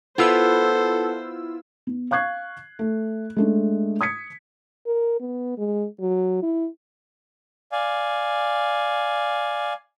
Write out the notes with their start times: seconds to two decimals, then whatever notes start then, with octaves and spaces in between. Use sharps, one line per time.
0.18 B3 E4 F4 A4 C5 E6
1.87 B3
2.11 F5 C#6 F#6 G#6 C7
2.79 A3
3.36 G#3 A3 D4
4.01 D#6 G#6 B6 C#7
4.87 A#4
5.20 B3
5.58 G#3
6.00 F#3
6.42 E4
7.72 D5 F5 G#5